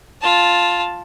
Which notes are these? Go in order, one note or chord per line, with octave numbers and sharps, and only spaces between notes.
F4 A5